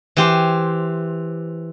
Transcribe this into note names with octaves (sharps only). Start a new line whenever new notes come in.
E3 G4 C5